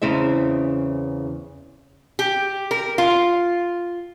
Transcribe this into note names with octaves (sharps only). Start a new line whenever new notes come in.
E2 C#3 C4 E4 E5
G4
A#4
F4